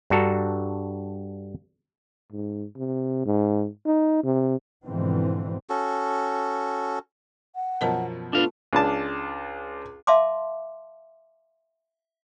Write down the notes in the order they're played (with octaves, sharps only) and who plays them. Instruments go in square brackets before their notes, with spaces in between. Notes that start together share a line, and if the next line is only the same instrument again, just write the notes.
[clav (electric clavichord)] G2 D4 F#4 A4 A#5
[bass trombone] G#2
C3
G#2
D#4
C3
[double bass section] G#2 B2 D3 E3 F3 C4
[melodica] C#4 F#4 A4
[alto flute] F#5
[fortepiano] F#2 B2 F3 [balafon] A#4 D#5 A5
[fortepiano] A3 B3 [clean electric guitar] D4 F5 [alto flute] F4
[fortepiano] C#2 D4 A5
[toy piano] E5 F5 A5 C6 D6